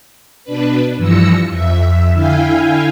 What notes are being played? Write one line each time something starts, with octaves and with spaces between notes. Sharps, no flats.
B2 D4 B4
G2 E3 F3 E6 A#6 C#7
F2 E5
D3 E4 F5 G5 G#5